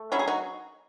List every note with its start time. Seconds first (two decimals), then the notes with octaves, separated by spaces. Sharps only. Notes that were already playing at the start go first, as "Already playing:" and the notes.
Already playing: A3
0.12 F#3 C#4 E4
0.19 G#4
0.27 D#4 F#4